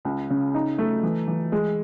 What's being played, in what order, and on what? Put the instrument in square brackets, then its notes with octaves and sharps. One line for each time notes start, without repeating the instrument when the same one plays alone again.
[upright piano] C#2
C#3
D#4
A3
E3
E3
G#3